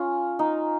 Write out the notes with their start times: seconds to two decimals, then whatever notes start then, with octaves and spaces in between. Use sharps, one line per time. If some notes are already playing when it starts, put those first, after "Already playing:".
Already playing: C#4 F4
0.39 D#4